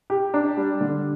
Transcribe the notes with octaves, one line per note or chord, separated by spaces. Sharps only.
G4
D4
G3
D3